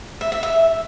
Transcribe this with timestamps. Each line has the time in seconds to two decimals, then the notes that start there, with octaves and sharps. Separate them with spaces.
0.21 E5
0.32 E5
0.43 E5